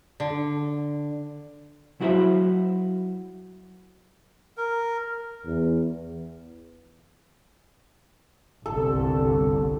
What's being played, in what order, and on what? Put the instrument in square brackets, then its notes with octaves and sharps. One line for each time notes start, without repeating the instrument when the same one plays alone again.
[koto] D3
[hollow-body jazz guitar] F#3 E4 F#4 C5 E5
[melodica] A#4
[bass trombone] E2
[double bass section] G1 C2 [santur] A4